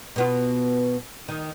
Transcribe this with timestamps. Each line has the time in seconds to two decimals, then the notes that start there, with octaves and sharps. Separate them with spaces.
0.16 B2 B3 F4
1.28 D#3